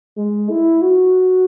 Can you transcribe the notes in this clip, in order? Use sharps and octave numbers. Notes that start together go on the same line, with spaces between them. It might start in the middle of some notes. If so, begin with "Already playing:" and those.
G#3
E4
F#4